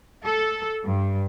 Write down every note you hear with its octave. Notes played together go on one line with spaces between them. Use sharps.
A4
G2